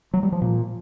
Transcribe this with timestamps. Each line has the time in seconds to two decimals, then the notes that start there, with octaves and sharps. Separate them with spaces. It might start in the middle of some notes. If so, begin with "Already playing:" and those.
0.14 F#3
0.23 G3
0.32 F3
0.42 A#2